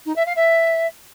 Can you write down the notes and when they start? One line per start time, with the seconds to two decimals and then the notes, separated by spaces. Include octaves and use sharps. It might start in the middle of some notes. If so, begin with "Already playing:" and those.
0.06 D#4
0.16 E5
0.26 F5
0.36 E5